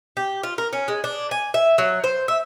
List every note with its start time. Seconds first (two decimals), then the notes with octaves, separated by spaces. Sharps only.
0.17 G4
0.43 F4
0.58 A#4
0.73 C#4
0.88 G#3
1.04 D4
1.31 G#5
1.54 E5
1.78 F#3
2.04 C5
2.28 E5